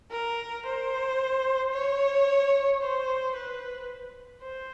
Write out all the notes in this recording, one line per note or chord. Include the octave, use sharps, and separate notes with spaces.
A#4
C5
C#5
C5
B4
C5